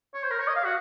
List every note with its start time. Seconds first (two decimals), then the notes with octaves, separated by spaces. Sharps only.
0.14 C#5
0.23 C5
0.31 A#4
0.39 C#5
0.48 D#5
0.56 F5
0.64 F#4